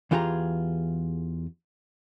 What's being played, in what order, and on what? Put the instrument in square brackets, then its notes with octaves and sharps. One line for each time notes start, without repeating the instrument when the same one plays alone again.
[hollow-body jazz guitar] E2 E3 F4 G4 G#4 A#5